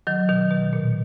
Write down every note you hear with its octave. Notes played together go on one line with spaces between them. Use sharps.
D#3 F#3
B2 D#3
B2
A#2